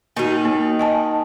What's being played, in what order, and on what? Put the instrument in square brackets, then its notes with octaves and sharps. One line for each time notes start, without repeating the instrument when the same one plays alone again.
[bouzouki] D#3 D#4 [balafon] A#3 F#4
[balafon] A#3
D#5 G#5 A5